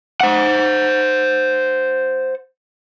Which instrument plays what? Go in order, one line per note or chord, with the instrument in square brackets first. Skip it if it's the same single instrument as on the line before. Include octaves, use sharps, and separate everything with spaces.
[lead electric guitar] C5 F#5